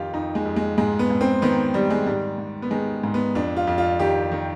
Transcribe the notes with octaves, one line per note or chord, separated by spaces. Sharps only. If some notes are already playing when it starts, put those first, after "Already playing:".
Already playing: F2 D#3 F4 G4
F2 D#4
G#3
F2
G#3
G#2 G#3
B3
G#2
C4
D#3 B3
D#3 G3
G#3
G#2 G3
G#2
B3
D#3 G#3
G#2
B3
F2 D4
F4
F2
F4
D#3 G4
D#3